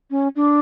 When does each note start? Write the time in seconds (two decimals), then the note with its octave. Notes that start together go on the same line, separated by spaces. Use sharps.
0.11 C#4
0.36 D4